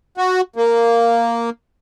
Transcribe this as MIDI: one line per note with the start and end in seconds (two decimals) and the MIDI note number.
0.18 0.41 66
0.56 1.50 58